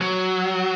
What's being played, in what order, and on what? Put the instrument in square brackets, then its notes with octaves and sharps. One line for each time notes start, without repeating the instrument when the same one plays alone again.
[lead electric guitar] F#3